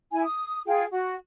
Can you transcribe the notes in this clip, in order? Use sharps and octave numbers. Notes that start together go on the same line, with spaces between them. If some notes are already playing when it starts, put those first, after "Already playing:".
E4 G#5
D#6
F4 G#4 G5
F#4